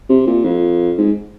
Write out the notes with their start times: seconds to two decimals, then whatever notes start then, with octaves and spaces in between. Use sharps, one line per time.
0.09 C3
0.27 A#2
0.44 F2
0.98 G#2